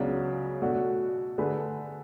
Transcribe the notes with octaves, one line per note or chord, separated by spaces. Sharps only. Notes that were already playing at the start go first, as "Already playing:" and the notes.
Already playing: C#2 C#3 F#3 B3 D4
B2 A3 D4 F#4
D3 A3 D4 G#4 B4